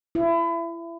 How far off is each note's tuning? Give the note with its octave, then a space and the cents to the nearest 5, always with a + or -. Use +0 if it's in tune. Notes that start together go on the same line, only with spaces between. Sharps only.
E4 +30